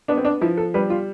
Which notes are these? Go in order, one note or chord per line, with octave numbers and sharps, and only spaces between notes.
B3 D4
C4
D4
F3 E4
A4
G3 B4
F4